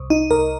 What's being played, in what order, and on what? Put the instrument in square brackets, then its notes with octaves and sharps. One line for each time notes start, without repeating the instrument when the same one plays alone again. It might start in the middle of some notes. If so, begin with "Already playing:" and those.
Already playing: [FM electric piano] C2
D#4
C2 A#4